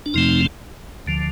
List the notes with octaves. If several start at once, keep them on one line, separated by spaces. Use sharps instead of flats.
D4
F2 C3 F3 A3 C4 D#4
D2 D3 F3